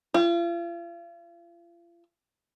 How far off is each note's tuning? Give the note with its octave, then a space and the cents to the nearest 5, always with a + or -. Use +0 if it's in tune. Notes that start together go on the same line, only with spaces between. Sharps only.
F4 -40